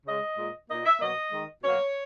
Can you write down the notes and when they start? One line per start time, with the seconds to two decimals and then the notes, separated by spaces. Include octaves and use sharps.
0.06 C#3 G#3 D#5
0.37 A#2 G#3
0.69 A#2 A#3 D#5
0.85 E5
1.00 B2 F#3 A#3 D#5
1.31 D#3 G#3
1.63 B2 F#3 A#3 C#5